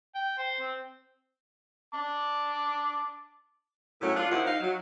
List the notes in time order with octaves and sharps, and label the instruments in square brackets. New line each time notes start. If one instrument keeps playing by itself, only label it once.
[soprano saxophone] G5
C5
C4
[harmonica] A5 D6
[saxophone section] A2 F#3 A3 A#3 C#4
D4 F4
D#2 F3 C4 E4 F#5
D#4 F5
F#3